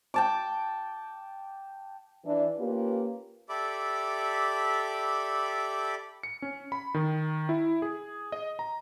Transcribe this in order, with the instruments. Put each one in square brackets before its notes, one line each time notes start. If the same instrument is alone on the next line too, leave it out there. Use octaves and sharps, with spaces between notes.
[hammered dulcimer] G5 A5 D6
[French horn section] E3 D4
A#3 C#4 F4 G4 B4
[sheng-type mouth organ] G4 A4 D5 E5 B5 D6
[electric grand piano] C#7
C#4
B5
D#3
E4
G#4
D#5
A#5